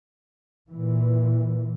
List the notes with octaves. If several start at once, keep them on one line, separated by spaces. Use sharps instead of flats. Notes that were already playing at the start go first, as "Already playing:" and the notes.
A#2 E3